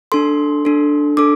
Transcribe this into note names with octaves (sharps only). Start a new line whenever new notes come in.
D4 A4 C6
D4 A4
D4 A4 D6